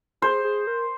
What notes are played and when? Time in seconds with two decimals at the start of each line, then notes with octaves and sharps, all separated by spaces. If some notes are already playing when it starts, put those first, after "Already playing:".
0.22 G#4 C5
0.44 G#4
0.67 A#4